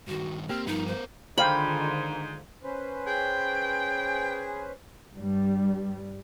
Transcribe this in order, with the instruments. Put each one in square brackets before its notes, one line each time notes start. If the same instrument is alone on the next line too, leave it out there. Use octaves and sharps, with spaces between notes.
[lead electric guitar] G2 D#3 [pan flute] F#4
[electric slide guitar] A#3 G4 [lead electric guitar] C4 [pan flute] F6
[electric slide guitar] G2 F3 [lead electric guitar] B3 A#4 [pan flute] D#4
[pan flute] C5
[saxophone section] G#2 [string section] D3 D#3 F4 [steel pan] C5 F5 G5 [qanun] B5
[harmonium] C#4 B4 C5
[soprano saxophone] G#4 [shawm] G5
[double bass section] G2 G3